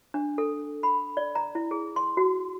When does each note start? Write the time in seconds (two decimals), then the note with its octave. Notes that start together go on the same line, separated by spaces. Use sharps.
0.14 D4
0.38 A4
0.83 B5
1.17 D5
1.35 A#5
1.55 E4
1.71 G#4
1.96 C6
2.17 F#4